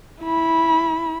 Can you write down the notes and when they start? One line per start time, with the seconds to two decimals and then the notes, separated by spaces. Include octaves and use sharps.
0.24 E4 B5